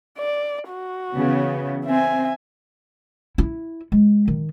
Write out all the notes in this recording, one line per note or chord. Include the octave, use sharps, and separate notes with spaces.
D5
F#4
C#3 E3 B3
C4 E5 G#5
E4
G#3
D#3